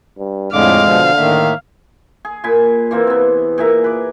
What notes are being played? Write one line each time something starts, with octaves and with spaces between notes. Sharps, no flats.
G2
F2 A2 D3 G#3 F5 D6
B2 D3 F3
A2 D#3 A#3 E5
G#4
A#2 G#5 B5
E3 A#3 C4
C3 B3
A#2 G#4 E5 A#5
B4 D6